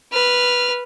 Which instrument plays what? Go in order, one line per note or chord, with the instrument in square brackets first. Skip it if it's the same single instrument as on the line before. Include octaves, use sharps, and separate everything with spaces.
[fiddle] B4 F6